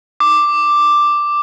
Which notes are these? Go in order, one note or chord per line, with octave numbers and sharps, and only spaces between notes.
D6